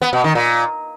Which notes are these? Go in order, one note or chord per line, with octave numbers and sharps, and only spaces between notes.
B3
B2
D#3
A#2